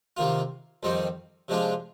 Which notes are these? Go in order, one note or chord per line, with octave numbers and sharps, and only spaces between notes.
C3 D#3 A#3 F4
F2 D#3 G3 C4 D#4
C3 F3 G#3 D4 F4